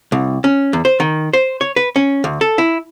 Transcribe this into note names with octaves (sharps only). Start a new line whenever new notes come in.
C2
C#4
E2
C5
D#3
C5
C#5
B4
C#4
D2
A4
E4